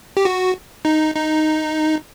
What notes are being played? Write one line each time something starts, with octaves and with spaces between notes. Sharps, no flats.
G4
F#4
D#4
D#4